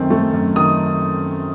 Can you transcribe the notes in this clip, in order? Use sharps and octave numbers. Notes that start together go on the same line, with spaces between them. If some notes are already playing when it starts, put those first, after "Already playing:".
Already playing: F#2 D#3 A3 C4
A3
F#2
D#3 D#6